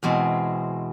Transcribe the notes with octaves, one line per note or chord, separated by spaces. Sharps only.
E2 B2 G#3 C4